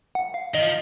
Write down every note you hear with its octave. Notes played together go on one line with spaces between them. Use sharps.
F#5
F5
D#3 D#5
F3